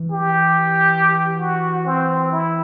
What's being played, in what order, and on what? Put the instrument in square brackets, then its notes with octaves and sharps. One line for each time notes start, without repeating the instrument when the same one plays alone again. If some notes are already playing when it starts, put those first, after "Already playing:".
Already playing: [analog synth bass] E3
[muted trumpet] G4
F#4
C4
E4